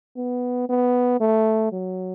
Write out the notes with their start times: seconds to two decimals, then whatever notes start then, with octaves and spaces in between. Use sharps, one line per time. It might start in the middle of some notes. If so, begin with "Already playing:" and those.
0.17 B3
0.69 B3
1.20 A3
1.72 F#3